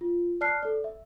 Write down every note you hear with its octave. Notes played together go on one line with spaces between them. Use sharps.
F4
D5 A5 F6 F#6 C7
A4 D5
E5